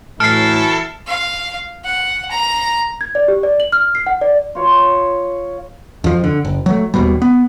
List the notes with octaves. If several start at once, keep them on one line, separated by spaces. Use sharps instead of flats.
A2 E3 F#3 E4 A4 F6 C7
F5
F#5
A#5
G#6
D5
G4
D5
F#7
F6
C7
F#5
D5
F4 C#5
F2 F3
D3
F#1
F#3 A3
D#1 D#2 B2 G3
B3